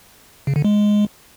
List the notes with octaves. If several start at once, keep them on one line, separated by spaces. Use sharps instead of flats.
C#3
D3
G#3